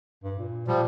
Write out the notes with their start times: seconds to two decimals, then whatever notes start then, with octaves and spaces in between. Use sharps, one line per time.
0.24 G2
0.39 A#2
0.67 A#2 F3 G3